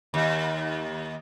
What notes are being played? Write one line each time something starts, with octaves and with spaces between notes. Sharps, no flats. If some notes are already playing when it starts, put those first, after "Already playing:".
D#2